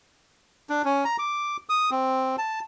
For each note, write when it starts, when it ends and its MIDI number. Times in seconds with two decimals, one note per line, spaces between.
0.69 0.82 62
0.85 1.04 61
1.05 1.17 82
1.19 1.57 86
1.69 1.90 87
1.91 2.36 60
2.38 2.60 81